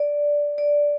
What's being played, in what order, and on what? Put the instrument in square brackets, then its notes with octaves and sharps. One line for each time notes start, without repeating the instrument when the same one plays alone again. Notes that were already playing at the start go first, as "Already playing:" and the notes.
Already playing: [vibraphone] D5
D5